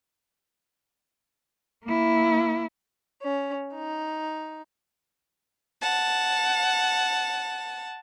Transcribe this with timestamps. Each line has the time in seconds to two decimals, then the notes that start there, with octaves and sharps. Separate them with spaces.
1.84 A#3 E4
3.20 C#4
3.72 D#4
5.81 F#5 A5